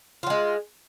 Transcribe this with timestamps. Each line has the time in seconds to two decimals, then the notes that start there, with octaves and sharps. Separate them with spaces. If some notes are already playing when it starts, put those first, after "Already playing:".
0.23 F4
0.27 F#3
0.30 G#3